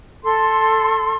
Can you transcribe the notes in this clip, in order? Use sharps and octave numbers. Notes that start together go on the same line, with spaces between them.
A4 C6